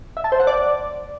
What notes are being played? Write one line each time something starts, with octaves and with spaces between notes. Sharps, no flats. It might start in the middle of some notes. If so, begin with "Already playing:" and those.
E5
A5
C5
F#5
D5